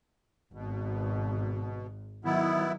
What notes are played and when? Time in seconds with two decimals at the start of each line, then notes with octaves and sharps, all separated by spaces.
0.53 G#1 B2
2.25 D#3 F#3 B3 E4